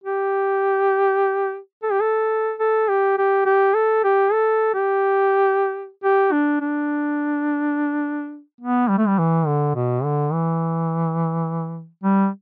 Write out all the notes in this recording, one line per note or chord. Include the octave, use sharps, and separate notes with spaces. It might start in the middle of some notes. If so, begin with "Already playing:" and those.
G4
A4
G4
A4
A4
G4
G4
G4
A4
G4
A4
G4
G4
D4
D4
B3
G3
A3
G3
E3
D3
B2
D3
E3
G3